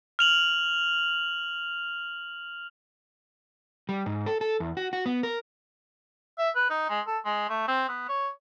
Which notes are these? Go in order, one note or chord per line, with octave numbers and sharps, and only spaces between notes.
F6 F7 F#7
G3
G#2
A4
A4
E2
F#4
F#4
B3
A#4
E5
B4
D#4
G#3
A4
G#3
A3
C4
B3
C#5